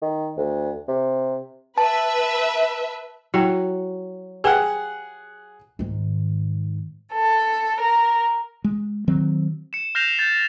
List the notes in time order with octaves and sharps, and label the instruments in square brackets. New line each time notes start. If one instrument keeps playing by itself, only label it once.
[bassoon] D#3
D2
C3
[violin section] B4 E5 [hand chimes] A5
[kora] F#3 [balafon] E4 G4 G5
[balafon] G4 B4 G5 [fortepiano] G#4 F#5
[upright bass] G#2 D#3
[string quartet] A4
A#4
[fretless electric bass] G#3
D#3 F#3 C4
[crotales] C#7 E7
F6 G6 A#6 C7 E7 F7
G6 A6